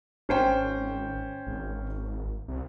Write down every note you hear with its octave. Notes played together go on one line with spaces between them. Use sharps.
G#1 C#4 C5 G5
G#1
C2